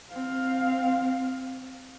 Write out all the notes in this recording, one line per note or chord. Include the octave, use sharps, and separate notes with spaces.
C4 F5